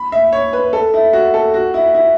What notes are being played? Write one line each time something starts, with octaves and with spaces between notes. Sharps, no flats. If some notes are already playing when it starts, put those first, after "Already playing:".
Already playing: B5
E5
C#5
B4
A4
E4
F#4
A4
F#4
E4
E4